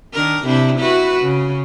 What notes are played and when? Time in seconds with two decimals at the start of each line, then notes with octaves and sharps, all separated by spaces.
0.13 D#3 D4 A#4
0.44 C3 D4 E4
0.79 E4 F#4 B4
1.21 C#3